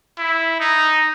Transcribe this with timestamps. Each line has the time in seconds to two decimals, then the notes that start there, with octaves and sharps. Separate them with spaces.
0.18 E4
0.59 D#4